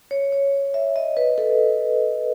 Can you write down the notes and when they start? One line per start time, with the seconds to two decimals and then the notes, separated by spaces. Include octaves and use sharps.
0.11 C#5
0.33 C#5
0.74 E5
0.96 D#5
1.17 B4
1.38 A4